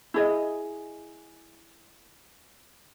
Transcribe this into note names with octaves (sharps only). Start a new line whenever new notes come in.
E4 G#4 D#5